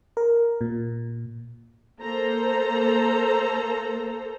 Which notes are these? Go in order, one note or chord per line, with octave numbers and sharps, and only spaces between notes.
A#4
A#2
A#3 A4 C5 A#5